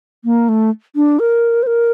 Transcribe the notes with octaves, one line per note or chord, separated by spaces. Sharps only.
A#3
A3
D4
A#4
C5
A#4